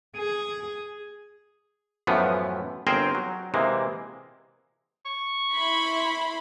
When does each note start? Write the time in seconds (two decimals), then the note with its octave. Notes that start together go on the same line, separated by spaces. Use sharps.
0.17 G#4
2.07 F#2 A2 E3 F3 B3
2.87 G1 C4 G#4 A#4 C5 G5
3.15 F#3
3.54 C3 E3 G#3 A#3
5.06 C#6
5.53 E4 B5 C6